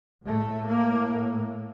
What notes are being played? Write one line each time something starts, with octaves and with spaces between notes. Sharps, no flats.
A2 A3
A#3